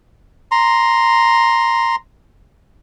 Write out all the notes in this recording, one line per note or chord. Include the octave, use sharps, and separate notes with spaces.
A#5 C6